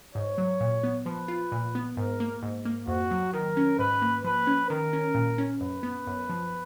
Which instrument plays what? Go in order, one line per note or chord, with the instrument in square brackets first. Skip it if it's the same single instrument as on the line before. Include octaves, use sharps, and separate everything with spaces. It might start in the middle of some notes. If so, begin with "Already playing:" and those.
[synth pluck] G#2 [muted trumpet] C#5
[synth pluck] F#3
A#2
B3
[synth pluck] F3 [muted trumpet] B4
[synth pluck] F4
A#2
B3
[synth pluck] G#2 [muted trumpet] A#4
[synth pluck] A#3
G#2
A#3
[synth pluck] F2 [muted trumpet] F#4
[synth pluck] F#3
[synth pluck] D#3 [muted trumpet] A#4
[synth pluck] C#4
[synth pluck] G#2 [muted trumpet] B4
[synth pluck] A#3
[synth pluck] F3 [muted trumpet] B4
[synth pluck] C#4
[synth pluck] D#3 [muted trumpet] A#4
[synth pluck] C#4
A#2
C#4
[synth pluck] F#2 [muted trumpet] B4
[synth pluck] B3
F#2
F3